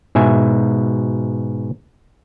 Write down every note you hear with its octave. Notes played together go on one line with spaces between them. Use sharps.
G#2 B2 E5 G#5